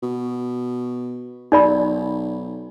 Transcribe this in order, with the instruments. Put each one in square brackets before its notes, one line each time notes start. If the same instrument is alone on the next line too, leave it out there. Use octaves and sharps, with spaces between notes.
[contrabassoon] B2
[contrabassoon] B1 [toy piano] D#4 D5 B5